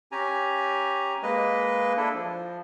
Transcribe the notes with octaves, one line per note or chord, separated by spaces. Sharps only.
C#4 G4 G#5 A#5
G#3 A#3 B4 D#5
D4 E4 A4
F3